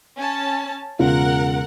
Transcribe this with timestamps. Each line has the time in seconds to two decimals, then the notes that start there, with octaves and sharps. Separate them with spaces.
0.18 C#4 A5
0.99 E1 C#3 F4 A#4 F#5